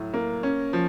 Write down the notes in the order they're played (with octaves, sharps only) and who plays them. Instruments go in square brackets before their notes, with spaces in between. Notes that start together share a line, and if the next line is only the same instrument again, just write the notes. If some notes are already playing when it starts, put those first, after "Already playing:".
Already playing: [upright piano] A2 F#3
A#3
C#4
F3